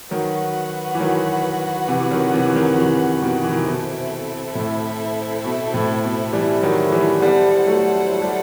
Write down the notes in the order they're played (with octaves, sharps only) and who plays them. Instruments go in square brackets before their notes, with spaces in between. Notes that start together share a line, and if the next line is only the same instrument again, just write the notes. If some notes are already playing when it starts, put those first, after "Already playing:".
[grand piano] D#3 F#3 [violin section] F#4 B4 F#5
[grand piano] E3
D#3 F#3
C3 E3
E3
D#3 F#3
C3 E3
E3
D#3 F#3
C3 E3
B2 D#3
E3
D#3
C3
[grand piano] B2 [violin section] C4 E4 A4 E5
[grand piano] A2
B2
A2
B2
E3 G3
D#3 F#3
A3
E3 G3
[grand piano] G3 B3 [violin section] E4 A4 C5 F#5
[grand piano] F#3 A3
F#3
G3